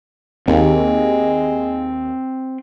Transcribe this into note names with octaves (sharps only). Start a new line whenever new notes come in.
D#2 G#3 C4